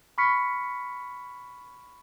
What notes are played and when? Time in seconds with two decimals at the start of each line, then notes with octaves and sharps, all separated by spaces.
0.18 B5 C#6 F6 B6 C#7